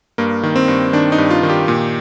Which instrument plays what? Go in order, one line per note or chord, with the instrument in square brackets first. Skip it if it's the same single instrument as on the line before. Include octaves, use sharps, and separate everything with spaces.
[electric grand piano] G2 A#3
D#3
C4
G2
D#3 D4
D#4
G2
F4
D#3
G4
A#2